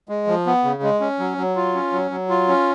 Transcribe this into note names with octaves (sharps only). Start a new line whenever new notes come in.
G#3
F3
B3
C#3
G#3
C#4
F#3
F#3
F4
C#4
F#3
F#3
F4
C#4